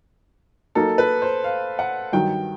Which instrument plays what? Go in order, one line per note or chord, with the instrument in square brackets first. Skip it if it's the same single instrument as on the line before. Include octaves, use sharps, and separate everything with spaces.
[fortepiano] F#3 A#3 D#4 [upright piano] A4
[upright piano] B4
C5
F5
F#5
[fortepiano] G2 D#3 F#3 [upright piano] G5